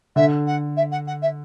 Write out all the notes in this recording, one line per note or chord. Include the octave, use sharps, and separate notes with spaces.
D3 E5
F#5
E5
F#5
F#5
E5